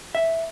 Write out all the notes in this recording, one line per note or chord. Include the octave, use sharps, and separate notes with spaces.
E5